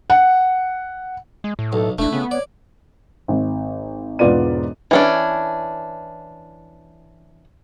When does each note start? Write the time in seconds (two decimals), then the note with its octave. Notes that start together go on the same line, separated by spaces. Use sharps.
0.10 F#5
1.44 G#3
1.59 A2
1.73 B1 A4
1.99 E1 A3 D4 E4
2.13 C#3 B3
2.31 C#5 D5
3.28 G#1
4.19 E1 G#2 B3 F4 D5 D#7
4.91 E3 C#4 D4